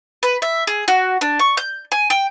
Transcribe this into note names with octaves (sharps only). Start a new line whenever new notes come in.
B4
E5
G#4
F#4
D4
C#6
G6
G#5
G5